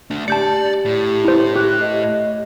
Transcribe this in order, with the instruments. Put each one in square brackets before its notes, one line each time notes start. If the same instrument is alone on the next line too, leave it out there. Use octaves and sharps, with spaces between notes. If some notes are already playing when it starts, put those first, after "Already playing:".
[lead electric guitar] A3 D4
[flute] G4 [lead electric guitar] D5 [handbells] A5 G6 C#7
[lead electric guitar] A2
[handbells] E4 C5
[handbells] G4 [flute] F#6
[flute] D#5